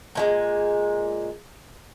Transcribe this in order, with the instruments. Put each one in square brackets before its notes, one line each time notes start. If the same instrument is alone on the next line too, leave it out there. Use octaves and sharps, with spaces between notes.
[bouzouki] A#2 E3 G#3